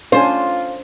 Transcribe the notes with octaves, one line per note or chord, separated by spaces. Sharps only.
C#4 D4 F4 C5 G#5